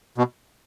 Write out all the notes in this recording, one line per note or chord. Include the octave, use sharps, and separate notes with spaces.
B2